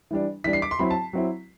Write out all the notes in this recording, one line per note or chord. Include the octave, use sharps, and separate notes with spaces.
E3 G3 D4
E3 G3 D4 B6
C7
D6
C6
F#3 C4 E4 B5
A5
F#3 C4 E4